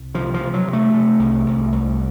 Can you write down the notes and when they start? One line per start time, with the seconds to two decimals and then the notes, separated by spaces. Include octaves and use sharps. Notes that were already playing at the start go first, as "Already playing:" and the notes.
Already playing: C2
0.14 C3 F3
0.34 F3
0.40 C3
0.53 F#3
0.68 C3
0.73 A3
0.94 C3
1.19 C2
1.46 C2
1.72 C2